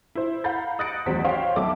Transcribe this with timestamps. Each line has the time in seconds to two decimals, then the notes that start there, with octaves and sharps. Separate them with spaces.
0.15 E4 C5
0.44 F5 F#5 A#5 B5 G6 A6
0.79 D#6 F#6 A6 A#6 C#7 D7
1.06 A1 E2 F#3 C5 B6
1.24 C5 C#5 F5 G5 C6
1.56 B1 F2 A4 E5 D6